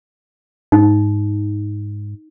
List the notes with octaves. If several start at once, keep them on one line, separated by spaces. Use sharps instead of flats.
G#2 D#4